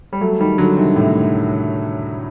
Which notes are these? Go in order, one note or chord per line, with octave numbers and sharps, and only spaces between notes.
G3
F#3 A3
D#3 G3
D3 F#3
C3 D#3
A2 C3